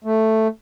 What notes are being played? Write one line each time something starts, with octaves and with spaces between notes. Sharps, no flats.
A3